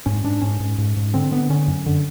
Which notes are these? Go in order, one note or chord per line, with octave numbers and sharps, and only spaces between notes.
G#2 C#4
G#2 D4
G#2 C#4
G#2
G#2
G#2
D3 C4
D3 B3
D3 C#4
F#2
D3